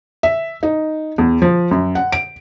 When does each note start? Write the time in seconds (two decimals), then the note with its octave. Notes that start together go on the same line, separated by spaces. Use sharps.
0.23 E5
0.63 D#4
1.18 E2
1.42 F3
1.71 F#2
1.95 F#5
2.12 D7